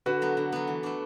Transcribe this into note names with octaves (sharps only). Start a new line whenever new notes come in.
D3 F#4 B4
F#3 B3
D3
F#3 B3
E3
A3 D4